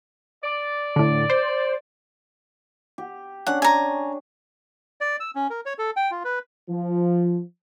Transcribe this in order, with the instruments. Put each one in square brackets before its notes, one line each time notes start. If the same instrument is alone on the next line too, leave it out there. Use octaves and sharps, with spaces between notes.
[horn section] D5
[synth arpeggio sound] A2 D3
C5
[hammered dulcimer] G4
[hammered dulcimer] C#4 D4 [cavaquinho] F#5
[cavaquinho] G#5 A#5
[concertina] D5
E6
C#4
A#4
C#5
A4
G5
F4
B4
[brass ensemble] F3